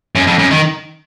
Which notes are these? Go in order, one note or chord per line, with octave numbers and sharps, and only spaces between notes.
F#2
F2
F#2
D#3